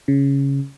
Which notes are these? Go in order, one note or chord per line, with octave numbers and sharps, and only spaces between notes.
C#3